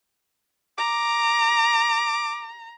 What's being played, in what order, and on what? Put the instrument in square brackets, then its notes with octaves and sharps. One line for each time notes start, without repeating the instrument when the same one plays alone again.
[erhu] A#5 [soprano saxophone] D6